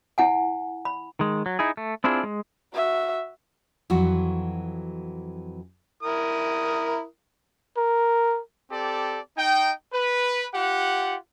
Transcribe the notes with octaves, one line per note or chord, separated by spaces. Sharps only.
E4 F#5 G#5
B5
D#3 G#3
F#3
D#4 E4 G#4
A3
C4 D4 E4 F4 G#4
G#3
F#4 E5
F2 E3 F#3 F#4
E4 A#4 D#6
A#4
C4 G4 A4 D5
D#4 G5
B4
F4 G4 F#5